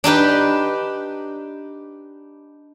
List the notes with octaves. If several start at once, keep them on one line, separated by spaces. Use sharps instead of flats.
D4 D#4 G4 B4